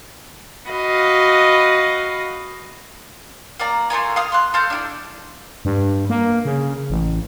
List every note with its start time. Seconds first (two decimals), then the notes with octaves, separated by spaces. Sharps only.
0.69 F#4 B4 D#5 F5
3.59 A#3 D5 A#5
3.90 A3 F4 A#4 G#5
4.16 F5 D#6 F6
4.32 C6 F#6
4.54 A4 F5 F6 G6
4.70 D4 E4
5.65 G2
6.10 A#3
6.45 C#3
6.90 A1